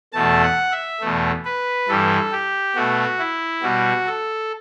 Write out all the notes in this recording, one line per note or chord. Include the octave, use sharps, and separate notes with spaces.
E2 B2 A3 A5
F#5
E5
E2 B2 A3
B4
G2 E3 G3 A4
G4
B2 A3 F#4
E4
B2 G3 F#4
A4